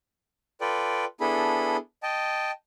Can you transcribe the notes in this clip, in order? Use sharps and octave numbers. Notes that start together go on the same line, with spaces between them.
F4 A4 B4 D5 G5
B3 D4 E4 G#4 A4 B5
D#5 G5 A5